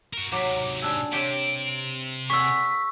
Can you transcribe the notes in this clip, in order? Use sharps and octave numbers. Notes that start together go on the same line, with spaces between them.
F#4 A#4
G#2 C3 F#3 B5 D6
G3 D4 G#5 E6
C3 G4 C#5 E5 D7
G#4 D5 F#5 C#6 E6 B6